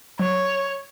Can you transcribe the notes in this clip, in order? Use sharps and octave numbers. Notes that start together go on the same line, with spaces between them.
F#3 C#5